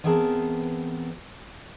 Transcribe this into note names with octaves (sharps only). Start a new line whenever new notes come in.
E3 B3 C4 G#4 A#4 A5